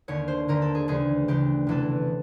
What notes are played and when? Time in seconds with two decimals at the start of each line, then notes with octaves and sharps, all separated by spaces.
0.08 D#2 D3 C#5
0.28 C5
0.48 D#2 D3 A#4
0.62 A4
0.75 G#4
0.88 D2 C#3 E3 G#4
1.28 D2 C#3 E3 G4
1.67 E2 C3 E3 A4